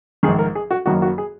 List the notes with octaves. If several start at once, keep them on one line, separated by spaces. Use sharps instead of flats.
A#1 G#2 D#3 G#4
A#4
G#4
F#4
F#1 F#2 D#3 F#3 A#3 F#4
F#4
G#4